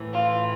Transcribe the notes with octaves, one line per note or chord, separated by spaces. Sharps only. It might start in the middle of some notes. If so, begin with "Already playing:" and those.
Already playing: A2 E3
F4